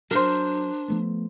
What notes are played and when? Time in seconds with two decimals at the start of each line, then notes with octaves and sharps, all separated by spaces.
0.11 F#3 D4 A#4 C5
0.88 F3 A3 B3